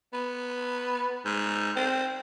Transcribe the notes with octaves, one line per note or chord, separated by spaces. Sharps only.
B3
G#2
C4